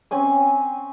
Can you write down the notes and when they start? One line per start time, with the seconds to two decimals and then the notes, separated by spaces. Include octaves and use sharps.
0.11 C4 C#4 G#5 D#6